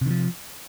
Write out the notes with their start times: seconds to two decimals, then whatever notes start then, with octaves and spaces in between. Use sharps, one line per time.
0.01 C3
0.06 D#3
0.10 F3